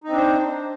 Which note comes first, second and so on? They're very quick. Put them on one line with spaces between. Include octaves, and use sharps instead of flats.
D#4 C4 D4 C5